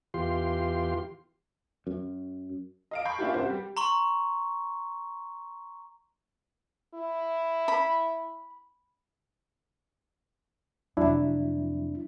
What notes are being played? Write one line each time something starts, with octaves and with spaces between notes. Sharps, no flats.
E2 F4 G4 C6
F#2
D#5 F5 D7
B5 C#6 G6 C7
A#3 C#4 D4 E4 F4 G4
C2 C5 F#5
G3 G4
A#5 C6 C#6
E4
B5
F2 C3 F#3 D4 E4